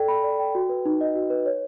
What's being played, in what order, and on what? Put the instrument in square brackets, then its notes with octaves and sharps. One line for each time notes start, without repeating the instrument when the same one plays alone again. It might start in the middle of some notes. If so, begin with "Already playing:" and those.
Already playing: [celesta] A4 D5 G5
B5
D5
G5
F#4
B4
D#4
D#5
F#4
B4
C#5